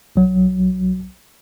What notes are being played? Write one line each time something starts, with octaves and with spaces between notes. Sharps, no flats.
B1 F#3